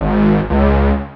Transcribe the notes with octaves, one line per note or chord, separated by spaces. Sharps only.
G#1
C#2